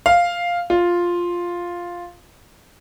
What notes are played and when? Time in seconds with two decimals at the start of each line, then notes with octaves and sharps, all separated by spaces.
0.06 F5
0.70 F4